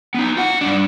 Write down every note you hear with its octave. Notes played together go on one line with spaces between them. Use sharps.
B3 D#4
F4 F#5
G2 D4